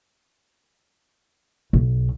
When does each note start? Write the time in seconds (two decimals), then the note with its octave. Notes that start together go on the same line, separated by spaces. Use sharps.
1.73 B1